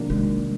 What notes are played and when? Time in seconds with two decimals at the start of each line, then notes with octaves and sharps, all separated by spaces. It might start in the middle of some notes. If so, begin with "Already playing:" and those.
Already playing: C3 D#3 F#3 A#3 D4
0.10 G#3